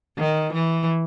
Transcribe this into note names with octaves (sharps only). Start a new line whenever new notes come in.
D#3
E3